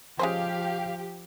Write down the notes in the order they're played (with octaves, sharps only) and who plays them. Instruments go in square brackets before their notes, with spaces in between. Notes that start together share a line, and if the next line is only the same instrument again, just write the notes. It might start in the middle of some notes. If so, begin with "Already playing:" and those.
[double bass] F3 [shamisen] G#3 C#4 C5 [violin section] G4 [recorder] F5